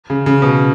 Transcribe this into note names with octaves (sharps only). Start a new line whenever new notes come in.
C#3
C#3
B2